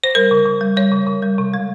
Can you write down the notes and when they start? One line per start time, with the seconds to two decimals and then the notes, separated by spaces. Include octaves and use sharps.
0.04 C5
0.15 G3 A#4
0.31 C#3
0.46 C#3
0.61 G3
0.76 G3 C#5
0.92 C#3
1.07 C#3
1.22 G3
1.38 C3
1.54 G#3